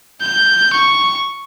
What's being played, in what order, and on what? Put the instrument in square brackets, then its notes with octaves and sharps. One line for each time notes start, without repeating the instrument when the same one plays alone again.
[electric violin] G6
C#6